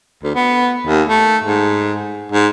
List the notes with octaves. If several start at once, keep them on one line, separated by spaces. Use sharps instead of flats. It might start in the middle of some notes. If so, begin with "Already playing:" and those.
D2
B3
D#2
A3
G#2
G#2